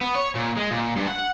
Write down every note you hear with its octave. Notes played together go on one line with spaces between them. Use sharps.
B3
C#5
A#2
G#3
A#2
G2
F#5